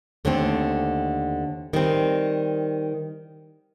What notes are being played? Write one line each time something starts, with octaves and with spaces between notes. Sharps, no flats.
D#2 D3 A3 C4
D#3 G3 C4